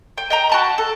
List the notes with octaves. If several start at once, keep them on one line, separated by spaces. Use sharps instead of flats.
G5
D#5 G5 A#5
F#4 A5 B5
A4